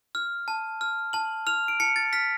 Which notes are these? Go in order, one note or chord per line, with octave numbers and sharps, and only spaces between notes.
F6
A5
F6
A5 F#7
F6 F7
D7
A5 C#7
A6
F6 B6